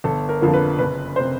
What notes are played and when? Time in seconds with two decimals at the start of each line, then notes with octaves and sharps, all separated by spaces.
0.04 G1 A4
0.29 A#4
0.41 F2 D3 F3 A#3
0.54 B4
0.79 F#1 B4
1.16 C3 C5